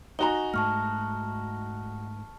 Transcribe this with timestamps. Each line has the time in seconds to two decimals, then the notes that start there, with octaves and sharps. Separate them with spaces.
0.19 D#4 F#4 G#5 A#5 G7
0.54 G#2 A3 A5 C#6 F6